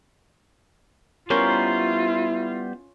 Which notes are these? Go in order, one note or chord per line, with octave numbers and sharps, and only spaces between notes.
G3 B3 C#4 E4 F4 A#4 C5